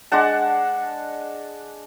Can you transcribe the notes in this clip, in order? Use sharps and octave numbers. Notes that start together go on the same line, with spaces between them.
G#3 D4 F#5 A5